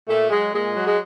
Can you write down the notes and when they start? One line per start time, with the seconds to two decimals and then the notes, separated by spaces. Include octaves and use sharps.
0.08 A#2 A3
0.30 F#3 G#3
0.53 A#2 G#3
0.76 F#3
0.86 G#3